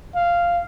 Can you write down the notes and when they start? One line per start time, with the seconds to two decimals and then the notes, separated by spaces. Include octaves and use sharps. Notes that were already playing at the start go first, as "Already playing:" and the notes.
0.15 F5